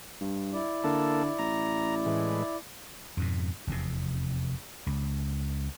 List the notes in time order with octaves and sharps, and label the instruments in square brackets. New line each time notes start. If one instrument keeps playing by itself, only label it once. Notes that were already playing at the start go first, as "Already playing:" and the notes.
[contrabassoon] G2
[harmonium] E4 D5
[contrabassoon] D3 [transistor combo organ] A#3 A4
[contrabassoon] A1 [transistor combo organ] A#5
[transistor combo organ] A2 E3 G#3
[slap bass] F2 G#2 B2
F1 E2 G#2 C3
C#2